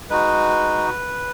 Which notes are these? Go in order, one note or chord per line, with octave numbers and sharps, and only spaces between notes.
G#3 D#4 F#4 B4